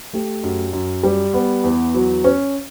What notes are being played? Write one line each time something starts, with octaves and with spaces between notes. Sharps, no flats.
A3 G4
F#2
F#2
G3
B3
E2
F#3
C#4